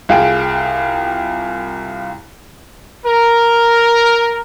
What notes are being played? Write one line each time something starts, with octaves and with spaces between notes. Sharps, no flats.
C2 F4 G#4 G5 D7
A#4